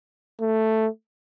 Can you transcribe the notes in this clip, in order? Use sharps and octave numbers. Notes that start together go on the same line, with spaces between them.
A3